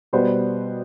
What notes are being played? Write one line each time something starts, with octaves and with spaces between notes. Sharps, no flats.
B2 G3 B3 C5